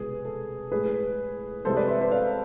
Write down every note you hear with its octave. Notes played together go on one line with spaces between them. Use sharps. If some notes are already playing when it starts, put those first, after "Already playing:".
Already playing: C2 B2 G#3 G#4 B4
A4
A2 G#3 G#4 B4
C2 C3 G#3 A4 C5
B4 D5
C5 E5
C5 E5
D5 F5